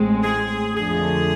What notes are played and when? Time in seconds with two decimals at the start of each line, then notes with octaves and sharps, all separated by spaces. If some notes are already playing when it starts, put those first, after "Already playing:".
Already playing: A1 A2 G#3 C4
0.23 G#4
0.75 F2 D3 F3 A3 G#4